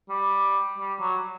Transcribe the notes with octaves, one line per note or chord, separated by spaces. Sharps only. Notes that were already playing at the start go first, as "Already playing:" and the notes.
G3
G3
F#3